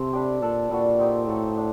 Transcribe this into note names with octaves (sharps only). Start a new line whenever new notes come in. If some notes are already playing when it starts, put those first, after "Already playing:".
Already playing: C3 A3 C4 C5
G3 D4 G4
A#2 D4 A4 D5
A#2 G3 D4 F#4
C4 D#4 G4
A2 A#3 F#4 A4
D4